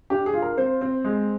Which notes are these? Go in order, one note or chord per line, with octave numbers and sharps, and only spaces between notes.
D4 G4
G#4
F4
A#4
C4 C5
C4
G#3